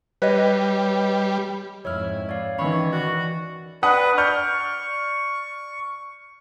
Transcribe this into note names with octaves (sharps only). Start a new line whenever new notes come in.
G3 B4 C#5 D#5
F2 G#2 E4 C#5 F6
C#5 D5 F5
D#3 E3 C#4 C#5 B5
F#4 D5
D4 B4 F#5 D#6
D5 C#6 F6 G6